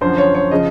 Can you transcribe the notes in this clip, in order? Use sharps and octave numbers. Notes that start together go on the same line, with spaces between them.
F#2 D3 F3 C5
C#5
C#5
C#3 F3 D#5